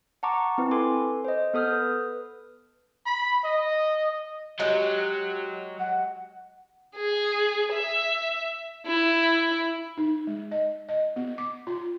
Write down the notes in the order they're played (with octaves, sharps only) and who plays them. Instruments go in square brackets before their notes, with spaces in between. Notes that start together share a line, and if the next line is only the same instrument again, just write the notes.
[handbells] F#5 A5 A#5 C#6 D6
C4 E4 B4
A4 B4 G#5 C6 D6
C5 D#5
B3 A4 D#6 F6 G6
B4
[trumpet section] B5
D#5
[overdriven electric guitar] F#3 [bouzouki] G#3 G4
[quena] F#5
[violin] G#4
E5
E4
[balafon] D#4
G#3
D#5
D#5
B3
D6
F4